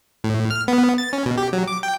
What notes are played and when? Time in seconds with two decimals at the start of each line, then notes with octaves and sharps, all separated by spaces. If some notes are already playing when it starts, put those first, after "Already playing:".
0.24 A2
0.50 F6
0.68 B3
0.98 A6
1.13 C#4
1.26 B2
1.38 G4
1.53 F#3
1.67 D6
1.83 G5